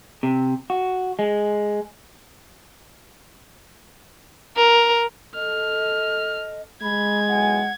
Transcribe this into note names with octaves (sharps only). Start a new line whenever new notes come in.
C3
F#4
G#3
A#4
A4 D#5 F6
G#3 B5 G#6
B1 E4 F#5 G#5